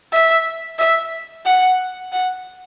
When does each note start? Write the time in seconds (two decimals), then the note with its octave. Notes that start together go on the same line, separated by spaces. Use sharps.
0.12 E5
0.79 E5
1.45 F#5
2.12 F#5